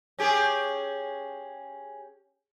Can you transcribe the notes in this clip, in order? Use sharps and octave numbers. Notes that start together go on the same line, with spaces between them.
C#4 G4 G#4